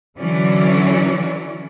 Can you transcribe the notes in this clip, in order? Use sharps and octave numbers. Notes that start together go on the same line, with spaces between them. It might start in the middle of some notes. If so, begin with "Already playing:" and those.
D3 E3 F#3 C#4 D5